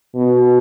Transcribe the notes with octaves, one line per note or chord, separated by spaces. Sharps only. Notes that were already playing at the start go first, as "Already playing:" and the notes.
B2